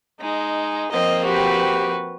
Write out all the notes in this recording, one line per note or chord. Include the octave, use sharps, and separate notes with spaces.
G#3 D#4
F3 A#3 C4 D#5
F#4 G4 B4